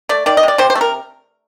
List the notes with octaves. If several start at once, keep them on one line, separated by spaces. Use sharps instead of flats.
A3 D5
D#3 D5
D#5
C3
D5
C3 C5
C5
A3
A#4